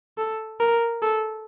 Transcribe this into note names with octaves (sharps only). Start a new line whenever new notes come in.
A4
A#4
A4